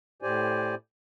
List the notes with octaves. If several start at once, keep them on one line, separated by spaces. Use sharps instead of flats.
A2 G4 C5 D5 G#5